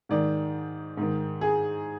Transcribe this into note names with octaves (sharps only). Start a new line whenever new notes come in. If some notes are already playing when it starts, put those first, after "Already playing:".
G#2 D#3 D5
G#2 D#3
G#4